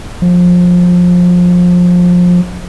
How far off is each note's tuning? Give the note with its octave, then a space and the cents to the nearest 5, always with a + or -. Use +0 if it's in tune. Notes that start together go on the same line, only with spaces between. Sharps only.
F3 +25